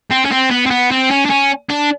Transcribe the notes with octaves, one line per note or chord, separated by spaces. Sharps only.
C4
C#4
C4
B3
C4
B3
C4
C#4
D4
C#4
D4